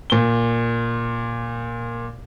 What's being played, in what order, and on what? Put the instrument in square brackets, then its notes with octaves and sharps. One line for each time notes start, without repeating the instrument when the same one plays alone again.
[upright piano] A#2 G7